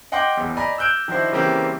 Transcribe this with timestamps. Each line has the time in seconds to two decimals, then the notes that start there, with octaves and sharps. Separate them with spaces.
0.12 D#5 F#5 G5 C6 D6 G6
0.37 F#1 E2
0.57 D5 D#5 G#5 A#5 B5
0.78 E6 F#6 G6 D7 E7
1.08 D#3 F3 D4 E4 F#4 C5
1.32 C#3 E3 G3 A#3 C4